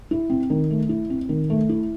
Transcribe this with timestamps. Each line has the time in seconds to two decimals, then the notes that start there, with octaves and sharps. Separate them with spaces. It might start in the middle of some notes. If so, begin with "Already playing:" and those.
0.11 E4
0.30 C4
0.50 D#3
0.70 A3
0.89 E4
1.10 C4
1.29 D#3
1.50 A3
1.69 E4